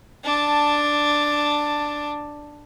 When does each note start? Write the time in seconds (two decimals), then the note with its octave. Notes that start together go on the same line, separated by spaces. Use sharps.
0.24 D4 A5